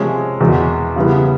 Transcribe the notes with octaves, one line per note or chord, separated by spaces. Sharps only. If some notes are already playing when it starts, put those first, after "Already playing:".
Already playing: C3 F3 G#3 C#4
E2 B2 G#3
C#3 E3 G3 B3